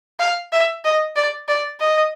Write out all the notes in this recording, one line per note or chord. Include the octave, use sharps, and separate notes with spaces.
F5
E5
D#5
D5
D5
D#5